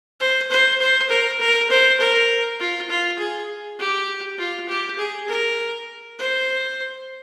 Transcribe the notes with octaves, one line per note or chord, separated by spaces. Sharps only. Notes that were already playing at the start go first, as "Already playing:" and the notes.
C5
C5
C5
A#4
A#4
C5
A#4
F4
F4
G#4
G4
F4
G4
G#4
A#4
C5